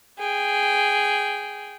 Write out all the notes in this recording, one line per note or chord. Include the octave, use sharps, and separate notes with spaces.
G#4 G5